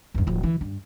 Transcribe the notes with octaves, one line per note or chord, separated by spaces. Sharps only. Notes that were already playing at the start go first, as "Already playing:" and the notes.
E2 G2
D1 F3
E3
G2